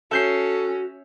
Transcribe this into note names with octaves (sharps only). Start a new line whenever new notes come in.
C#4 F#4 A4 E5 G6 C7